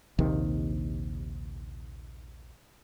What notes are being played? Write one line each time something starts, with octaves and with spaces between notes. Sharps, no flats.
A#1 D#2 C3 D#3